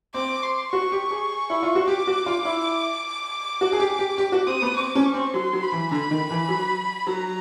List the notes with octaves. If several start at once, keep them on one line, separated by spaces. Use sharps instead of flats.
C4 D6
C6
F#4 C#6
G4
G#4
E4
F4
F#4
G4 D6
F#4
F4
E4
F#4
G#4
G4
G4
G4 D6
F#4
C4 D#6
B3
C4 D6
C#4
C#6
C4
F#3 C6
F#3
B5
E3
D3 B5
D#3
E3
F#3
F#3 A#5